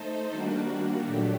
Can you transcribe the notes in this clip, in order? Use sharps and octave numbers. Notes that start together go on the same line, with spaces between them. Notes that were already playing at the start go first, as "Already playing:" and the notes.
Already playing: A3 D#4 A4 C5
D#3 G3 A#3 D4 F#4
A#2 F#3 A3 D4 G4